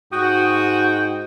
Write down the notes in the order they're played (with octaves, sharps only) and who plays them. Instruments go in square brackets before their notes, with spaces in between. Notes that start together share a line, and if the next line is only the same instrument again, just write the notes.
[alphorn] G#2 [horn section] F#4 [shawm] G5 [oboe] D#6